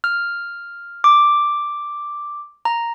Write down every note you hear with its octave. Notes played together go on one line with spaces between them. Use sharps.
F6
D6
A#5